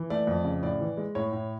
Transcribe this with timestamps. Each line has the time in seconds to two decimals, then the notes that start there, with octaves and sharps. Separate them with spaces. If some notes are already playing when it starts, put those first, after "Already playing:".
Already playing: E3
0.10 A3 D5
0.27 F2
0.44 C#3
0.62 A2 D5
0.81 E3
0.97 G#3
1.15 A2 C#5
1.33 A2